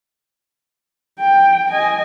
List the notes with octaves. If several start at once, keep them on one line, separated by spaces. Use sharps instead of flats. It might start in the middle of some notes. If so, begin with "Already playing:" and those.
G5
D#5 G#5